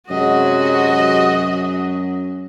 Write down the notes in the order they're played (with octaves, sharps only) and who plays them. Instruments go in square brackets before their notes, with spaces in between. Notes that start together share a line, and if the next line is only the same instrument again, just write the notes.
[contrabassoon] F#2 [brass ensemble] C3 F#3 G#3 [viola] F#4 D#5